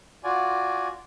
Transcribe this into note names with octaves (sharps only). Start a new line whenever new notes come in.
F4 F#4 D5 G#5